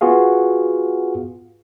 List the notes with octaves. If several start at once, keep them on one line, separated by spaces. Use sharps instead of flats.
B3 F4 F#4 G#4 F5